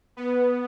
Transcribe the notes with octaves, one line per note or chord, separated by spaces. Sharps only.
B3